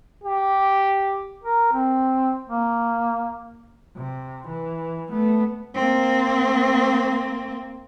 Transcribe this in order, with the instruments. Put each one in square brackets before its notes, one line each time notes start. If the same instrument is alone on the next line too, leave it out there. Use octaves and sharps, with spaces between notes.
[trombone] G4
[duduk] A#4
C4
A#3
[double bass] C3
E3
A3 B3
[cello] A#3 C4